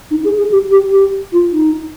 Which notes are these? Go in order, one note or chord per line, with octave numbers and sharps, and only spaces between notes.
D#4
G#4
G#4
G4
G4
G4
F4
D#4